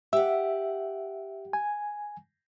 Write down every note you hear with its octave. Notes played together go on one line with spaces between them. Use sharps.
G4 E5 F#5
G#5